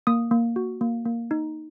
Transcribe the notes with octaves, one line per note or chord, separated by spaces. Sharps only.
A#3 D#6
A#3
F#4
A#3
A#3
D#4